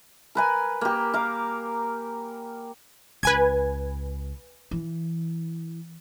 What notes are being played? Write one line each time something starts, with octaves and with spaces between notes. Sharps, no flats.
A#4 B4 G#5
A#3 G4
A#4 F5
C#2 B4 G#5 G#6
E3